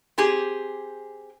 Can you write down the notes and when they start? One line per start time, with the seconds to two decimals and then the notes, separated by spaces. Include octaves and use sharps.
0.18 C4 G4 G#4